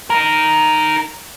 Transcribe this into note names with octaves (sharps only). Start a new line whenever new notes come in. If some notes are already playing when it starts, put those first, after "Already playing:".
D#4 A#4